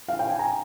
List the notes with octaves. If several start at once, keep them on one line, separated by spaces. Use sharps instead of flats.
F5
G5
G#5
A#5